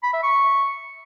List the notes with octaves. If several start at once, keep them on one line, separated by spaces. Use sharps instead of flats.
B5
E5
C#6